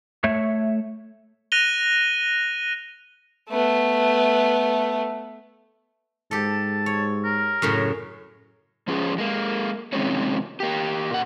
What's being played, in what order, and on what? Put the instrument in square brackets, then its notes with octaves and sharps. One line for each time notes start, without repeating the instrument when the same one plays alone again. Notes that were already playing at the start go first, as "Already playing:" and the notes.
[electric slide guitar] A3 C#5 E5
[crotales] F#6 A#6 D#7 F7 G7
[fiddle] A3 B3
[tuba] G#2 [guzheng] G4 A4 [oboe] A5
[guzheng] C#5
[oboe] A#4
[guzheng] F#2 A2 C#3
[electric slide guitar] F3 C#4 F4 G#4
G#3 A#3
C3 D#3 F3 G#3 C4 C#4
A#3 G4
A#2 F#5